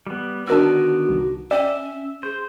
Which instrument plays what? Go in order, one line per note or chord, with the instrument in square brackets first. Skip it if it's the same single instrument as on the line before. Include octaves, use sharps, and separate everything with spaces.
[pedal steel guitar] G3 B3
[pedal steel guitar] D3 D#3 B3 [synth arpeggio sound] D4 A#4 E6 [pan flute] F#4
[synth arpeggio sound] C2
[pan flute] C#4 [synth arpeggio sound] D5 G5 [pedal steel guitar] E5
[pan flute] G#4 [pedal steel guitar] C5